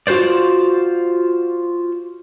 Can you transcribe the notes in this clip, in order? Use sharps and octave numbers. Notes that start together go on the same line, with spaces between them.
F4 F#4 B4 C5 D5